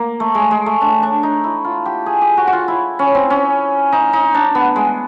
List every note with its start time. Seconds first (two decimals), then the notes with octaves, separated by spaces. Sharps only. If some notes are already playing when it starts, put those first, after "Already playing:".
Already playing: A#3
0.20 A3
0.35 G#3
0.51 G#3
0.66 A3
0.81 D4
1.03 D4
1.23 D#4
1.44 E4
1.64 F4
1.86 G4
2.06 G#4
2.22 G4
2.37 F#4
2.47 F#4
2.53 F4
2.68 E4
2.99 C#4
3.15 C4
3.30 C#4
3.92 D#4
4.13 D#4
4.34 D4
4.55 B3
4.76 G#3